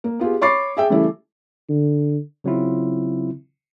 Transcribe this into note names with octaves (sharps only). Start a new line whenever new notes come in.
A#3
B3 F4 G4 G#4
C#5 B5 C#6 D6 A6 C7
G#4 E5 G5
C#3 E3 G3 A3 E4
D3
C#3 F#3 C4 E4 F4